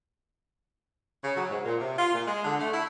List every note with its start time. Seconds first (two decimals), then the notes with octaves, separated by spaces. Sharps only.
1.24 C#3
1.36 F#3
1.49 G#2
1.65 A#2
1.80 C3
1.97 F4
2.13 A#2
2.27 G#3
2.44 D3
2.59 A3
2.72 E4